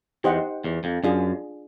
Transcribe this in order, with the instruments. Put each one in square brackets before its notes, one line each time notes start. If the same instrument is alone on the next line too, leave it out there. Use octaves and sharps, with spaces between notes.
[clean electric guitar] E2 [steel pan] D#4 G4 C5 D#5 F#5
[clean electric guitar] E2
F2
[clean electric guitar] F#2 [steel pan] D4 F4 G#4